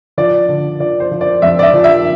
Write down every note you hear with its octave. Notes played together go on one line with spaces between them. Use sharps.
F3 D5
D3
F3 D5
C5
F3
D5
F2 E5
D5
E5
F3
E5